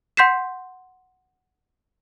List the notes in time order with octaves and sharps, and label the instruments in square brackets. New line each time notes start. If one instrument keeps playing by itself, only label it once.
[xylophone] F#5 C6 G6 B6 C7 E7